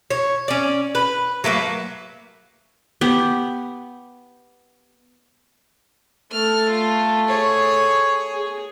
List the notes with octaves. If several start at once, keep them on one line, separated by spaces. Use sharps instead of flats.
C#5
C#4 D5
B4
F#3 A3 A#3 B4
B3 G4
A3 A4 F6
F4
G#4 C#5
G#4